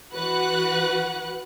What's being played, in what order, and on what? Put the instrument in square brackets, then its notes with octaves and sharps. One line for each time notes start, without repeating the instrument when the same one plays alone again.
[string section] E3 F#4 B4 F#5 F#6